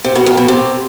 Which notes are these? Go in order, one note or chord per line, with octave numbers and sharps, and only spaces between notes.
C3
B2
F2
B2
C3